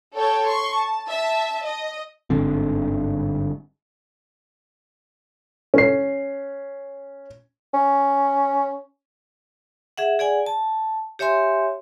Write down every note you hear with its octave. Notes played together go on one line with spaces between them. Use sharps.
A4 C#5 G5 A5
C6 C#6
A5
E5 A5
D#5
G1 G#2 D3 C4
C#4 C7
C#4
G#4 E5 F#5
G#4 D5 F#5 G#5
A5
G4 C#5 E5 G#5 C6